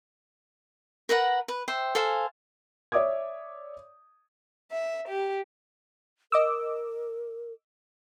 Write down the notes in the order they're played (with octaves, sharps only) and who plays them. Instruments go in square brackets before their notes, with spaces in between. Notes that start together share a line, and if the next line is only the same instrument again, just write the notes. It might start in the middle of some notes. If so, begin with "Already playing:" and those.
[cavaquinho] A#4 B4 F#5 A#5
B4
C5 E5 G5
A4 C5 F5 G#5
[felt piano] C#5 D5 E5 D6 D#6 G#6
[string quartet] E5
G4
[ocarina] A#4 [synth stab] D#5 D6 E6